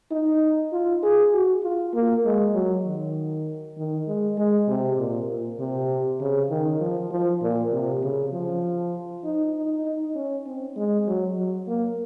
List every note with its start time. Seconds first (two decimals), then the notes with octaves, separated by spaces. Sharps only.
0.12 D#4
0.73 F4
1.03 G#4
1.34 F#4
1.64 F4
1.94 A#3
2.25 G#3
2.54 F#3
2.85 D#3
3.77 D#3
4.07 G#3
4.38 G#3
4.68 C3
4.98 A#2
5.29 A#2
5.59 C3
6.21 C#3
6.50 D#3
6.81 F3
7.11 F3
7.42 A#2
7.72 C3
8.03 C#3
8.33 F3
9.24 D#4
9.55 D#4
9.85 D#4
10.15 C#4
10.46 C4
10.76 G#3
11.07 F#3
11.37 F#3
11.67 A#3